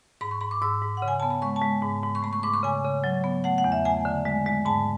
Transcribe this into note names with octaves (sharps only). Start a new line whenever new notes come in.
G#2 B5
C#6
G#2 B5
D6
G#2 E6
G#2
F#5
C#3
G#5
B3 A5
B5
G#3 C#6
A5
G#3
G#2
G#2
C#6
A3 B5
C#6
G#2 D6
C#6
C#3 G#5
C#3
F#3
B3
A3 F#5
F#5
E2
E5
A3 G#5
D3
G#3
G#3
G#2 A5